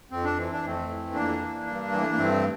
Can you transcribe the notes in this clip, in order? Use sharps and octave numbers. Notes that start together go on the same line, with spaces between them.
F2 C4
D4
E3 C4
D4
F2 A3 C4
E3
F2 A#3 D4
E3
G2
E3 G3
A3
A#3
G2 A3 C4